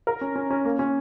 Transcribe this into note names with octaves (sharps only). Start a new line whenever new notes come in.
A#4
C#4
C#4
C#4
A#3
C#4